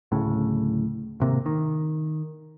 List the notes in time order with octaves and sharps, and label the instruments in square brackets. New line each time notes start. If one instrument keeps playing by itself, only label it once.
[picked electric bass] D1 A2 C#3
G#1 C3 A#3
D#3